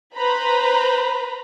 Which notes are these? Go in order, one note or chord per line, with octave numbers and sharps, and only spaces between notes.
B4 C5 A#5 B5